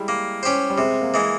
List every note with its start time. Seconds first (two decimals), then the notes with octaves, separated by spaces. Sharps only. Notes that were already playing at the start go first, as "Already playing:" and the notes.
Already playing: G3 G#3 E4
0.08 A#3
0.43 C#4 G4 C5
0.70 G3
0.78 C3 G#3
1.01 A#3
1.14 E3 G#3